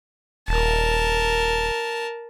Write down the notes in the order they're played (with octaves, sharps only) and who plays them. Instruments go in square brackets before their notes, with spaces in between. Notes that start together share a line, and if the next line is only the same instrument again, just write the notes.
[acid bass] D#1 [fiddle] A#4 A5